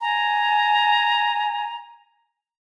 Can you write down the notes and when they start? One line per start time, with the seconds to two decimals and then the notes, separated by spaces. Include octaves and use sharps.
0.01 G#5 A#5